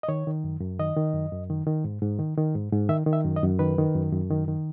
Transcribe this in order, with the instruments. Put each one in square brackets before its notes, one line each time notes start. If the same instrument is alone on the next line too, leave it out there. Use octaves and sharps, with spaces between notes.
[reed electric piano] D#5
D#3 C#5
D#3
F#2
F#2
D#3 D#5
D#3
F#2
F#2
D#3
D#3
G#2
G#2
D#3
D#3
G#2
G#2
D#3 E5
D#3
E5
F#2
D#5
F#2
D#3 B4
D#3
F#2
F#2
D#3
D#3